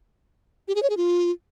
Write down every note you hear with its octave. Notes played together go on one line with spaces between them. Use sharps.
G4
G#4
C#5
G#4
F4